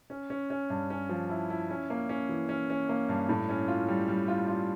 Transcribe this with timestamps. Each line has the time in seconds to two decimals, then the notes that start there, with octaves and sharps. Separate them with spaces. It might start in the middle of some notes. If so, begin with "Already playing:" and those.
0.10 C#4
0.30 C#4
0.50 C#4
0.70 G2
0.90 C#4
1.09 F3
1.29 E4
1.50 E4
1.70 C#4
1.90 A#3
2.09 C#4
2.29 E3
2.49 C#4
2.70 C#4
2.89 A#3
3.09 G2
3.29 A2
3.49 C#4
3.68 F4
3.88 G3
4.08 G3
4.28 F4
4.48 F4